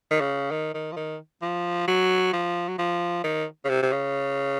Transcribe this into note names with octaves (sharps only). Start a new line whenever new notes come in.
D#3
C#3
D#3
D#3
F3
D#3
F3
F#3
F3
F#3
F3
D#3
C#3
C3
C3
C#3